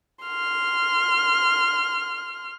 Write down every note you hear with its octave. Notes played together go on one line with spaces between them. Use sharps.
C6 F6